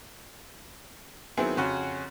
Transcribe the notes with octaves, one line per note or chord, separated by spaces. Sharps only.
D#3 F#3 B3 C4 E4 G#4
F2 C#3 C#4 F#4 F#5 C6